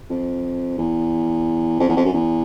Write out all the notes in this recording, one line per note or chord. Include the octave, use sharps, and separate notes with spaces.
F2
E2
F2
E2
F2
F#2
E2